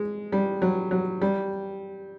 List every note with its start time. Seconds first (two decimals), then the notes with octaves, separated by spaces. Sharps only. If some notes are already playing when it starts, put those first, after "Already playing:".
Already playing: G#3
0.32 G3
0.62 F#3
0.91 F#3
1.22 G3